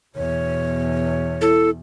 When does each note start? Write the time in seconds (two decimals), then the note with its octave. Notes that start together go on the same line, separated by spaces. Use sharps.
0.15 E2 B2 C#5
1.41 E4 A4